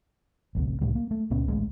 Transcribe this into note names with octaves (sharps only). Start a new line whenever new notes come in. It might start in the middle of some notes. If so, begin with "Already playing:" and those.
A1 D2 C3
C2 A2 D3 G3
A#3
A3
C#2 A#2 B3 C#4
A1 D2 G#3